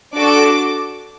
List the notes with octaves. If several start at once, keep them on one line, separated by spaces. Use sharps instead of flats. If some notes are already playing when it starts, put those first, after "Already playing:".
D4 F#4 A4 D6